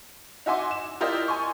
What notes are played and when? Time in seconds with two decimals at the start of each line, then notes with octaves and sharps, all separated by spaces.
0.46 D#4 F#4 E5 G#5 C6 D6
0.71 E7
1.01 E4 F4 G4 A#4 D5 D#5
1.28 G#5 C6 C#6